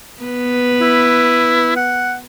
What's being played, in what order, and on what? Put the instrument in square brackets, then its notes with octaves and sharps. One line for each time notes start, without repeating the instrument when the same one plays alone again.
[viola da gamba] B3 B4
[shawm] E4
F#5